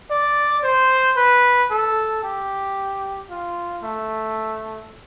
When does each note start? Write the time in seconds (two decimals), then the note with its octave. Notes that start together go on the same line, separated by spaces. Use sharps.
0.10 D5
0.63 C5
1.16 B4
1.71 A4
2.23 G4
3.30 F4
3.84 A3